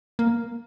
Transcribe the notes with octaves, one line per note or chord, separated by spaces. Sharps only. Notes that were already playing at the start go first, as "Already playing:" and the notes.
A#3